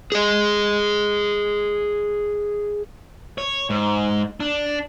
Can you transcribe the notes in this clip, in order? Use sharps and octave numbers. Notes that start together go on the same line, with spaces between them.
G#4 D#5
C#5
G#2
D4